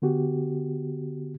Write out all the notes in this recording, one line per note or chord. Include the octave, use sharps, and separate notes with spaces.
D3 B3 F#4 G4